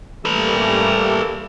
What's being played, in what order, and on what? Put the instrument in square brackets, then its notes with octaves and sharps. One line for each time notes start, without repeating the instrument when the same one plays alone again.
[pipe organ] G3 A3 A#3 [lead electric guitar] A4 B4